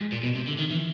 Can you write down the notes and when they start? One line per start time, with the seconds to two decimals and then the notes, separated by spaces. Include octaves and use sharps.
0.01 G#2
0.12 A#2
0.23 B2
0.35 C3
0.48 D3
0.59 D#3
0.71 E3